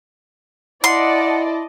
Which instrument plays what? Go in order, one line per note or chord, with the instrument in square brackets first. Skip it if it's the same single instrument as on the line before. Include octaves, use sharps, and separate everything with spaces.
[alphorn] E4 [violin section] D5 D#5 A5 [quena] F#5 [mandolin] C6